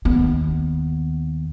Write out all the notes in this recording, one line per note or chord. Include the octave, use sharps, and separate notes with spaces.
D#2 B3